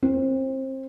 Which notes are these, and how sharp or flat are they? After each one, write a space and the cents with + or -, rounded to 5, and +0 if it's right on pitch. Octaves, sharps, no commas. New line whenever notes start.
C4 +25